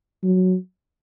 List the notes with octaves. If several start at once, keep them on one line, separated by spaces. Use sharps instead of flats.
F#3